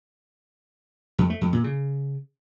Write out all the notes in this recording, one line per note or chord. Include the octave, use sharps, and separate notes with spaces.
F2
A3
F2
A#2
C#3